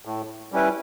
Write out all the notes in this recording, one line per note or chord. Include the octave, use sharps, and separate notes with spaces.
A2
G3 C#4 E4 B4